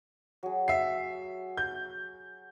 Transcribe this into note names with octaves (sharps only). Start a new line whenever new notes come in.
F#3 G#4
E5 C7
G6